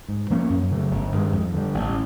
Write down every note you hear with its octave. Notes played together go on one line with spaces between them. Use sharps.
G#2
F3 A#3 C#4
F#2
C#3 F#3 A3
G1
G2 D#3 G#3
F2
D3 G3
A1